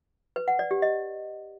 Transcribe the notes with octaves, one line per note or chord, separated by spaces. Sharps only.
B4
F#5
D5
G4
D#5